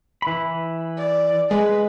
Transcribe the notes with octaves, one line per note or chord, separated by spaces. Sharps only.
E3 B5
D5
G#3 B4